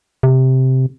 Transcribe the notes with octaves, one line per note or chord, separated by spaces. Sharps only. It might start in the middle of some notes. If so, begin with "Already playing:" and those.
C3